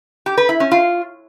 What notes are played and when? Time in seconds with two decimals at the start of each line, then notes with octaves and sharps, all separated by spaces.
0.26 G4
0.37 B4
0.49 E4
0.60 C#4
0.72 F4